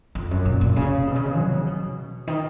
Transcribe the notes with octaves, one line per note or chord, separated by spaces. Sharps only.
F2
F#2
A#2
A#2
C#3
B2
C#3
B2
F#3
C#3
B2
D#3